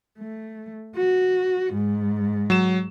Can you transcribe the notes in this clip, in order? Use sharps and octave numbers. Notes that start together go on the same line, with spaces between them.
A3
F#4
G#2
F#3 E7